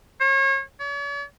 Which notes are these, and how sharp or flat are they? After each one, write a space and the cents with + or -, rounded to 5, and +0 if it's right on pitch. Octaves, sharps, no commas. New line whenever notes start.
C#5 -35
C#5 +45